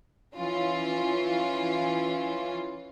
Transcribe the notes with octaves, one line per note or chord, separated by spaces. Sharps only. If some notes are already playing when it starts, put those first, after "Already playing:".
E3 C#4 F4